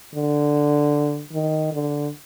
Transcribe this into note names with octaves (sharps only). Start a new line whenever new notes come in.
D3
D#3
D3